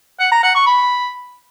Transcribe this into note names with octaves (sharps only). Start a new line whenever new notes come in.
F#5
A#5
F#5
C#6
B5